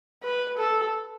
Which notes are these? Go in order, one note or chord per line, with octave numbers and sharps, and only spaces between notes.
B4
A4